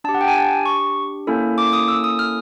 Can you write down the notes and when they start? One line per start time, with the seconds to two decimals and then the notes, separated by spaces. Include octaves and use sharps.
0.04 D4 G4 A5
0.14 F#5
0.21 G5
0.28 G#5
0.35 A5
0.66 C#6
1.27 A#3 C#4 E4 A4
1.58 D6
1.73 D#6
1.88 E6
2.04 D#6
2.19 F6